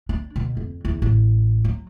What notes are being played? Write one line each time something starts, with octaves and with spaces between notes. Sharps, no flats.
D4
B2
F2
E2
A1
F#3